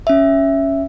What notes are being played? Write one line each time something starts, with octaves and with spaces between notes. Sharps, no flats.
C#4 E5